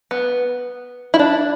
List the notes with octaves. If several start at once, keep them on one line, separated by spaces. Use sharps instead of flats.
B3
E4
D4